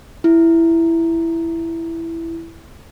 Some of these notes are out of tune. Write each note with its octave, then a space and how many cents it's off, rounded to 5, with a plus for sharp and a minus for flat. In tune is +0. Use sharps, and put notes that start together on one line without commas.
E4 +5